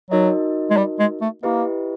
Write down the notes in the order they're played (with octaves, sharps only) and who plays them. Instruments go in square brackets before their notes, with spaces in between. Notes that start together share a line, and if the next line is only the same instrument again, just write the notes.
[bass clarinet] F#3 [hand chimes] D#4 F#4 A#4 D#5
[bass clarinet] G#3
G3
G#3
A3
[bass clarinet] A#3 [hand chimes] E4 G4 B4 D#5